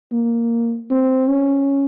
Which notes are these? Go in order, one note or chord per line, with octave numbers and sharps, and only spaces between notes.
A#3
C4
C#4